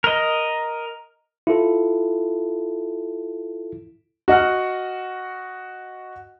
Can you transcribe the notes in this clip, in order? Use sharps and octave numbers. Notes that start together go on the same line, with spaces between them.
A#4 D#5
E4 F4 A4
F#4 D#5 F#5 F6